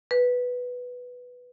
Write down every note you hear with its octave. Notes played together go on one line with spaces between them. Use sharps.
B4